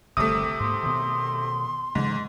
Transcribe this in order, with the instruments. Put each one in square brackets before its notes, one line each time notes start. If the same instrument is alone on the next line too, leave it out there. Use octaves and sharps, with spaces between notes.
[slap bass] G1 C2 D#3 [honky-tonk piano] C3 A3 [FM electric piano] D#6
[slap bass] G#2 A#3 [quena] C6
[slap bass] B2 D#3
[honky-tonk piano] G#2 [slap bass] C#3 E3